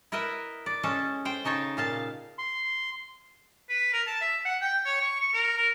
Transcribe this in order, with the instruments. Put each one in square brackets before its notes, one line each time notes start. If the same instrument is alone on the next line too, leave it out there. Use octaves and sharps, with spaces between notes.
[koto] E4 A#4 B4 D#5 E5
D5
G#3 C#4 A4 A5
C5 G5
C#3 D#4 C#5 A5
A#2 F5 A5
[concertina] C6
[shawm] B4
A#4
A5
E5
F#5
G5
C#5
C#6
C#6
A#4
A#4